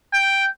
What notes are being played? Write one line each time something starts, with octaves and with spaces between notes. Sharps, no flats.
G5